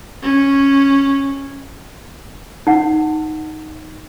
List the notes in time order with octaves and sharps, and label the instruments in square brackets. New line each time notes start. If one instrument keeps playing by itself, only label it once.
[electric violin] C#4
[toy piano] D#4 F#5